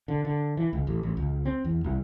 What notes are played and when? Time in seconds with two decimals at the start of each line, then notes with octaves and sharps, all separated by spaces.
0.08 D3
0.25 D3
0.57 E3
0.73 C#2
0.87 A1
1.03 A1
1.17 C#2
1.45 C4
1.65 E2
1.84 C2